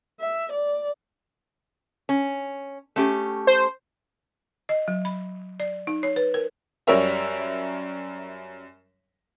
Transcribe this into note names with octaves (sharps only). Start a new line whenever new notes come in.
E5
D5
C#4
A3 C#4 G4
C5
D#5
F#3
B5
D5
D#4
C#5
B4
A#4
F#2 G3 A#4 C#5 E5 A#5